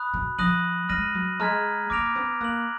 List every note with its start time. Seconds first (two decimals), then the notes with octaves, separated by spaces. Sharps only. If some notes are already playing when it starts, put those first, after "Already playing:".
Already playing: B5 D#6 F#6
0.14 B2
0.39 F3 D#6 F#6 A#6 D#7 F#7
0.89 G#3 F6 A#6 D#7 F#7
1.14 F#3
1.39 G#3 A#5 F6 G#6 B6
1.90 A#3 D6 F6 A#6 D7 F7
2.16 B3
2.41 A#3 F#6 D7 F#7